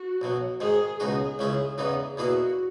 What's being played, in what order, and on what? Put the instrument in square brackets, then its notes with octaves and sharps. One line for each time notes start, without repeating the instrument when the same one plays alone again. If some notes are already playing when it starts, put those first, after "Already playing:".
Already playing: [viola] F#4
[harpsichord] B1 B2 F#3
[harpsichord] G#2 D#3 G#3 [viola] G#4
[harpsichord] C#2 B2 G#3 D#4 F#4 [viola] G#4
[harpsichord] C#2 C#3 G#3 C#4 E4
[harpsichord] E2 C#3 E3 B3 D#4 [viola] G#4
[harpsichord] E2 B2 A#3 E4 G#4 [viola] F#4